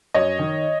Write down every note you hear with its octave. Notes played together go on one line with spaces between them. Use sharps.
F#2 C#5 D#5
D#3